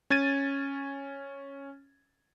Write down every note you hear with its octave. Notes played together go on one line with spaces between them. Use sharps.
C#4 G#6 A6 D#7